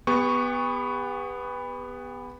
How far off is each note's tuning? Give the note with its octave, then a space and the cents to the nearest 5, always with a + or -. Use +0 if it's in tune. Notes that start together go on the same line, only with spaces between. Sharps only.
B3 +0 G4 +45 C#6 +0